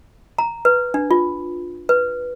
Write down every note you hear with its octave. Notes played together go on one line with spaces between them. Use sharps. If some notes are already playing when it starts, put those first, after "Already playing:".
A#5
B4
D4
F4
B4